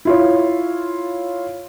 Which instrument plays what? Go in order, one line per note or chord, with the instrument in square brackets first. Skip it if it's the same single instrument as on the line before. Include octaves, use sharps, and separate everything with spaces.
[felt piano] E4 F4 C#5